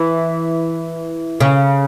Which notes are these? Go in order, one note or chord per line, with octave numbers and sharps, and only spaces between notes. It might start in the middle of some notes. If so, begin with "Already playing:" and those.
Already playing: E3
C#3